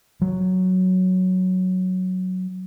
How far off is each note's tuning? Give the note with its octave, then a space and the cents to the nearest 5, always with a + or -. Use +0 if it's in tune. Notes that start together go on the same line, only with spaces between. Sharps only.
F#3 +0